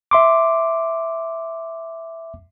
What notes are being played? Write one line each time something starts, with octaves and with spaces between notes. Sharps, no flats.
E5 C6 D6